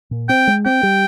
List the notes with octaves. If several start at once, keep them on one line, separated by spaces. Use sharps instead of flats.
A#2
C4 G5
G#3
C4 G5
G3